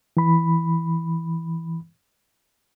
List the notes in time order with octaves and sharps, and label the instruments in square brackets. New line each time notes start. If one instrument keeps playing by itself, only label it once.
[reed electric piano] E3 B5